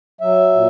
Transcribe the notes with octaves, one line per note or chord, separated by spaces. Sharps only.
F#3 E5
A#2